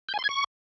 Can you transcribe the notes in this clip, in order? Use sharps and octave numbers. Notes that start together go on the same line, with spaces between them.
G6
G#5
C6
G#6
C#6